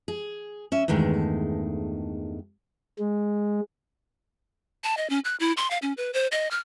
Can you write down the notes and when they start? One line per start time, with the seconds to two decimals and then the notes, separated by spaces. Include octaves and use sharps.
0.08 G#4
0.72 C#4 E5
0.88 E2 G2 D#3 G#3 A3
2.99 G#3
4.84 A5
4.97 D#5
5.10 C#4
5.25 F#6
5.40 E4
5.57 C6
5.71 F5
5.82 C#4
5.97 B4
6.13 C5
6.32 D#5
6.51 F6